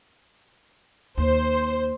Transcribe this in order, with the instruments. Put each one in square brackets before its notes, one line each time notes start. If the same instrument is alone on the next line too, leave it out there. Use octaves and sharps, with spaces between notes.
[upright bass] D#2 [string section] C5